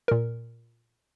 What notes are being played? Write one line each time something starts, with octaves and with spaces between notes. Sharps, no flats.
A#2 A#4